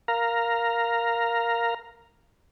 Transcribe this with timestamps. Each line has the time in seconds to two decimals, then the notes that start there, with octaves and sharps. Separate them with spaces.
0.08 A#4 F5 A#5